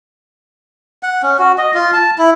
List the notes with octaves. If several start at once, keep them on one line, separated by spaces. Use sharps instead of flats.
F#5
C#4
F#4
D#5
F4
A5
E4